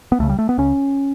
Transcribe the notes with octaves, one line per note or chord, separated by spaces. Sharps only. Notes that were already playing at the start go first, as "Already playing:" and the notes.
B3
C#2 C#3 A3
G3
A3
B3
C#2 C#3 C#4